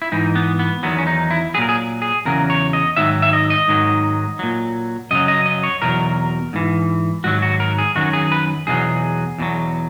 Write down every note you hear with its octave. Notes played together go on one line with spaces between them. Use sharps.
E4
G#2 E3 D#4
B3
B3
E2 D#3 F#3 B3
C#4
D#4
E4
A#2 F#3 G#4 A#4
G#4
G#4
E2 C#3 F#3 A#4
C#5
D#5
G#2 D#3 F#3 E5
E5
D#5
D#5
G#2 D#3 F#3
A#2 F#3
F#2 C#3 F#3 D#5
D#5
D#5
C#5
E2 B2 F#3 A#4
G#2 E3
G#2 D#3 F#3 F#4
F#4
A#4
G#4
F#2 D#3 F#3 F#4
G#4
B4
E2 B2 F#3 G#4
E2 B2 F#3